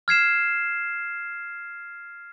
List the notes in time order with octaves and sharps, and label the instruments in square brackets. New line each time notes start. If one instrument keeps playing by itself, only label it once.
[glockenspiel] F6 G#6 C7 E7